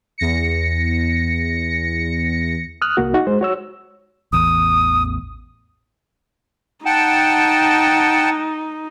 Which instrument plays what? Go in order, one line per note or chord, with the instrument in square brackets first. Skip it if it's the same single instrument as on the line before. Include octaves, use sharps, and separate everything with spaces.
[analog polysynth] E2 A#6 C#7
[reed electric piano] D#6 F6 F#6
C2 A#3 F#4
D#4 F#4
G#3 C5
F#4 C#5 E6
[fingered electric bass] A1 E2 [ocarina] D#6
[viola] D#4 [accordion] F#5 G5 A5